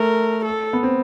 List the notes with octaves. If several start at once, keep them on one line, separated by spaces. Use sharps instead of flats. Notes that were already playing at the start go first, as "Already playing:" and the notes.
Already playing: A3 A#4
A4
B3
C4